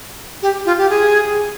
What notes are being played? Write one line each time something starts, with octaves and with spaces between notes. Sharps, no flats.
G4
F4
G4
G#4